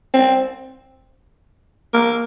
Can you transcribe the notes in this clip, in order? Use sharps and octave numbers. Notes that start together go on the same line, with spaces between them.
C4
A#3